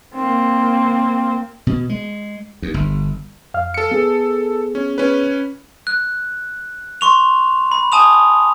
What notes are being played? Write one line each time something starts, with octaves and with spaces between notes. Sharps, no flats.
A#3 C4
B2
G#3
D#2
G1
F2 F5 F6
A4 C#7
B3 G#4
C#4
C#4 B4
F#6
C6 C#6 F7
B5
G#5 A5 D#6 F7